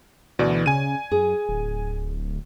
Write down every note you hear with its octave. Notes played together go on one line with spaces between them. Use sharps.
D2 B2 E3 D5
C#3 G#5 D#7
F#2 G#4
D1